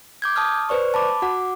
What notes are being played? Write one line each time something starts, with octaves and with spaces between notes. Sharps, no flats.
D6 G6 G#6
A5 D#6 F6
B4 C5 D5 C#6
A5 B5 D6
F#4 F#5 D6